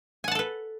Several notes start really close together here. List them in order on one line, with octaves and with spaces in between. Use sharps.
G#5 F#5 A5 A4 B4